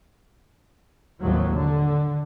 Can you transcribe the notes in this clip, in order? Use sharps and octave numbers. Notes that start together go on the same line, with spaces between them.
G#1 D#2 A2 F3 F#3 A#3
D3